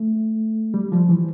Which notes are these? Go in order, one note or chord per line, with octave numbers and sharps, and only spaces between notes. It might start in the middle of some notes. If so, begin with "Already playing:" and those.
Already playing: A3
G3
F3
E3